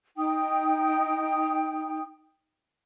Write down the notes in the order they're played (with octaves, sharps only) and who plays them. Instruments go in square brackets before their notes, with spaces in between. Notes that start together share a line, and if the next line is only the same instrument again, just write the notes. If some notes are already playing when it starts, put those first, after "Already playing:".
[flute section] D#4 G5 D#6